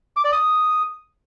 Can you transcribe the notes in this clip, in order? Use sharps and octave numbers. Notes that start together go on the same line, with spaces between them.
D6
D5
D#6